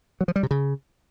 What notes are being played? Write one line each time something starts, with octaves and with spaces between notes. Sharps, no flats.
F#3
F3
G3
C3
C#3